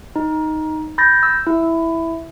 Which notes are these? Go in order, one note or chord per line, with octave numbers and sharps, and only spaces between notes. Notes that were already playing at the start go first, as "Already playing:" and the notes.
D#4
B5 G6 A6 A#6
E6
E4